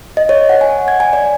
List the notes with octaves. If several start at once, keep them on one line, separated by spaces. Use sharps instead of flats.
D#5
C#5
F#5
G#5
G#6
G#5
D5